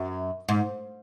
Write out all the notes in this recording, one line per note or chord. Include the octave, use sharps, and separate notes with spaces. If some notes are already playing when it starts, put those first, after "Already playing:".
Already playing: F#2
G#2